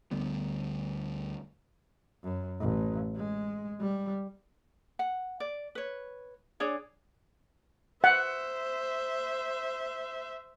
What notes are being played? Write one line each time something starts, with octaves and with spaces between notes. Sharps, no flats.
D2 D3 G3 B3
F#2
A1
G#3
G3
F#5
D5
B4 C#5
D4 G#4 C#5 D5
C5 E5 F#5